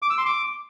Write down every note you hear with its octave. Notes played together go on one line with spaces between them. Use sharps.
D6
E6
C6
D6